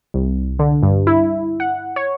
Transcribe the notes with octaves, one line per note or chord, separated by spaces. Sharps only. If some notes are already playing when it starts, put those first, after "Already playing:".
C2
D3
G2
E4
F#5
C#5